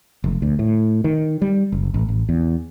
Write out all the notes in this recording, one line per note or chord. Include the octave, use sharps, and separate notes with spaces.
F1
D2
A2
D#3
G3
F#1
A1
A1
E2